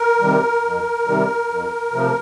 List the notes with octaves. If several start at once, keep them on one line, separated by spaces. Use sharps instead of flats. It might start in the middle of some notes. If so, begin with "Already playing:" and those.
Already playing: A#4
C3 D#3 G3
F2
C3 D#3 G3
F2
C3 F3 A3